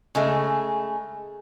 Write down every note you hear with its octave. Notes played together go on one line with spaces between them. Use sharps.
C#3 G#3 A3